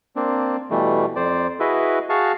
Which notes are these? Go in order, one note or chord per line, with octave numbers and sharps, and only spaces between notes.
A#3 C4 D4
B2 E3 G3 A3
F2 C5 D5
E4 F#4 G#4 B4 D#5 E5
F#4 G#4 F5 A5 C#6